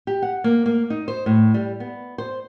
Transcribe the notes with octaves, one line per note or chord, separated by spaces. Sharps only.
G4
F#5
A#3
A#3
D#4
C5
A2
G3
B3
C5